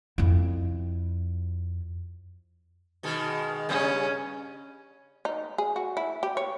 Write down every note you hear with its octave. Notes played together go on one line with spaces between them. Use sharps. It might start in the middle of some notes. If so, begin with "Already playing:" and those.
F2 E4
B2 D#3 G#3
G2 C#3 C#4
D#4
G#4
F#4
E4
G4
C#5